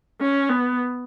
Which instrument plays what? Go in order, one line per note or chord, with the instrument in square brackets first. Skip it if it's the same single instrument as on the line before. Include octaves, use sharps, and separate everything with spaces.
[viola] C#4
B3